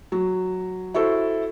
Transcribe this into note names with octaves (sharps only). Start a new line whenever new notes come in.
F#3
E4 F#4 A4 C5